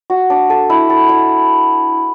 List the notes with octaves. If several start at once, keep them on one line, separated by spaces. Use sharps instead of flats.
F#4
D4
A4
E4
A4
E4